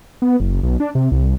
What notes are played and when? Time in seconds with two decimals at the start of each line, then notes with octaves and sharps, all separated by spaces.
0.22 B3
0.40 F#1
0.63 B1
0.80 D4
0.95 C3
1.11 C2